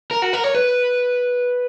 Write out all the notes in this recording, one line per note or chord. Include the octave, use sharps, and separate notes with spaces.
A#4
F#4
A#4
C#5
B4